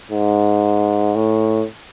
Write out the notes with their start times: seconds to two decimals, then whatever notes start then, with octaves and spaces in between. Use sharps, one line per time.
0.12 G#2
1.15 A2